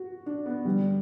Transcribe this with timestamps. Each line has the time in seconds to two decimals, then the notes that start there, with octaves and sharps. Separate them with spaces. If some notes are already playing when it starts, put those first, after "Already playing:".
Already playing: F#4
0.26 D4
0.46 B3
0.65 G2 D3 G3